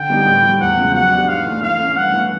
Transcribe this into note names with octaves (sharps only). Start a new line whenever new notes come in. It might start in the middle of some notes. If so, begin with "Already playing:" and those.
Already playing: D3 G5
G3 B3 D#4 G4
A2
E3 G3
E2 F#5
C#3 F3 G#3
F#3 F#5
B3 D4 G4
G#2 F5
E3 A3 D4
E3 F5
A3 C#4
G2 F#5
E3 A3